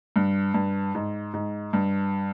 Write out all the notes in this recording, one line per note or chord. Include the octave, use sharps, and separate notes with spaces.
G2
G2
G#2
G#2
G2